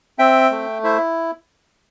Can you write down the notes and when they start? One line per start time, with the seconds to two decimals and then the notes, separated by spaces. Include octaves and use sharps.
0.19 C4 E5 G5
0.51 A3
0.84 E4 C5 E5